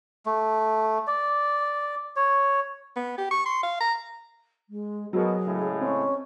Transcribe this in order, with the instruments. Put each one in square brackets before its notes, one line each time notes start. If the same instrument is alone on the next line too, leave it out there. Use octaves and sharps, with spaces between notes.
[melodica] A3
D5
C#5
[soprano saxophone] B3
G4
C#6
C6
F5
A#5
[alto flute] G#3
[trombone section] B2 [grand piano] F#3 A#4 [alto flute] G#4
[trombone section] A2 C#3 G#3
[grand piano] C4 [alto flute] C#4